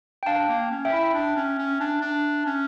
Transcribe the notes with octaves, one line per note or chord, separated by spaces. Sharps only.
G5
D4 F5 A5
A#3
C#4
E5 G5
E4
D4
C#4
C#4
D4
D4
C#4